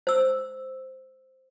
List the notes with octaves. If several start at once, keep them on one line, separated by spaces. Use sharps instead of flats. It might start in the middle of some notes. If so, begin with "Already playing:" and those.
C5 E6